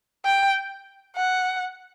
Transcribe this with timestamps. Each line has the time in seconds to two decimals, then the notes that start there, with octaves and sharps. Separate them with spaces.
0.25 G5
1.16 F#5